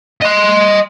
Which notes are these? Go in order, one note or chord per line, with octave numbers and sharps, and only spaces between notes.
D#5 C6